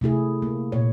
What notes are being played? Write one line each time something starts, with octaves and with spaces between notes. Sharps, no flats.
C3 A3 E4 G#4
A#3
A#2 C#5